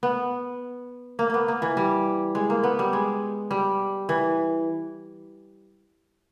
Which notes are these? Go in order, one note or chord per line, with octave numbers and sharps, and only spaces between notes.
B3
A#3
A#3 B3
A#3
E3
G3
G#3
A#3
B3
G3
G#3
G3
E3